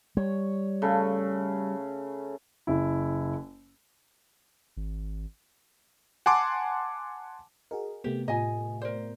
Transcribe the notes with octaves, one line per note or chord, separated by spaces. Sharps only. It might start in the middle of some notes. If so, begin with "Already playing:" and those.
G3 C#5
C#3 A3
F#1 E4
G#1
F#5 G#5 A5 C6 D6
F#4 G#4 A#4 D#5
C3 A3 B3 G4
A2 F4 D#5 G#5
A#4 C5 D5